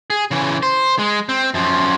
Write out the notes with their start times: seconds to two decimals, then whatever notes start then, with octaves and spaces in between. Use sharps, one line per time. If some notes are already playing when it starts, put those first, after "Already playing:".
0.10 G#4
0.31 C#3 E3
0.63 C5
0.99 G#3
1.29 C4
1.54 F#2 F3